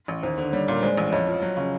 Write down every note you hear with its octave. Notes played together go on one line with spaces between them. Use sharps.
A1
D#2 C5
D3 C5
G3 C#5
A#2
G#3 C5 D5
A1
F2 C#5 D#5
F3
F#3
C#3